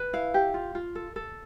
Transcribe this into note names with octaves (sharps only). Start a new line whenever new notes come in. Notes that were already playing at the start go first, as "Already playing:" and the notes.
Already playing: B4
E4 F5
G4
F4
F4
A4
A4